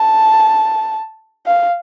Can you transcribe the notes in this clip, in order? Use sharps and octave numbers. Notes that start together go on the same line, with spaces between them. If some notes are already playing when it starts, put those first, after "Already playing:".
Already playing: A5
F5